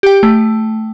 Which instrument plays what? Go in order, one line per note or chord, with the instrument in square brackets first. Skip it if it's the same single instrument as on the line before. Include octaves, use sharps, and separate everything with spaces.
[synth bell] G4 G5
A3